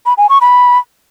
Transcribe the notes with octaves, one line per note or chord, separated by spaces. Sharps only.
B5
G#5
C#6
B5